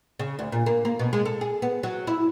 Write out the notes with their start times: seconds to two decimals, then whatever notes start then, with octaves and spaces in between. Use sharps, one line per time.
0.19 C#3
0.39 D2
0.52 A#2
0.66 A#3
0.85 A#3
0.99 B2
1.13 G#3
1.25 A4
1.41 G#4
1.62 B3
1.83 F#3
2.07 E4